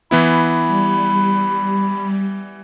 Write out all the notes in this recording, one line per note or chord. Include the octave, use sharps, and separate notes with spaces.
E3 B3 E4 B5
G3